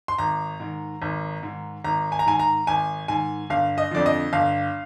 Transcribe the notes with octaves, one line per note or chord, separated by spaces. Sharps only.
C6
G#1 A#5
G#2 D#3
G#1
G#2 D#3
G#1 A#5
G#5
A#5
G#2 D#3 G#5
A#5
G#1 G#5
G#2 D#3 G#5
G1 F5
D#5
F2 D3 F3 D5
D#5
G1 F5